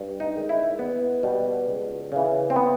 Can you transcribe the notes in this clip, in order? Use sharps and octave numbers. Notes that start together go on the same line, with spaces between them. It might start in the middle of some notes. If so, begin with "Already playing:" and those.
Already playing: G2
D#4
D#3 G#3
E4
E2 B3
B2 G3
C#2
C#3 E3
C4
B3